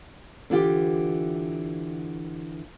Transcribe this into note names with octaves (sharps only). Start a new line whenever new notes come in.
D3 E3 F4 G4